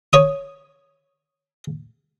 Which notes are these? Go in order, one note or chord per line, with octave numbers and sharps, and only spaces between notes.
C#5 D#6